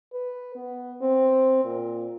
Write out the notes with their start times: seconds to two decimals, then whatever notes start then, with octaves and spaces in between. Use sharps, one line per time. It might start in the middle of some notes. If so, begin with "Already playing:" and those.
0.13 B4
0.55 B3
1.02 C4
1.65 A#2